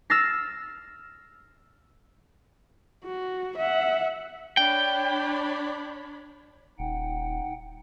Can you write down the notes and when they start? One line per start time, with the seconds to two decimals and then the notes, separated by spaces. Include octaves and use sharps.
0.10 E6 F6 A6 A#6 C7
3.05 F#4
3.58 E5 F#5
4.57 D4 C#5 G5 B5
6.79 D#1 D#4 F#5 G5